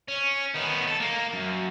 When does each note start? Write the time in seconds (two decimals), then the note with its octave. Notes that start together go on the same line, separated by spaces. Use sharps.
0.08 C#4
0.55 D#3 B3
0.88 A4
1.00 A#3
1.33 F#2